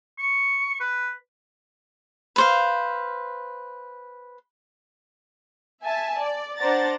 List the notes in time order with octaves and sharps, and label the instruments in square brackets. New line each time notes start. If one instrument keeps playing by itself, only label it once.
[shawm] C#6
B4
[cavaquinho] B4 C5 F5
[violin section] E5 G#5 A5
D5
D4 C5 D5 F#5 A#5 A6